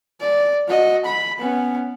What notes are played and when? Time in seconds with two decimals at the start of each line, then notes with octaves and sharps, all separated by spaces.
0.21 D5
0.68 F#4 D#5
1.05 B5
1.39 B3 C#4